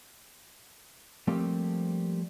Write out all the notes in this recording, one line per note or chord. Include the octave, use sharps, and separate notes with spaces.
F3 G3 A3 A#3 C4 G4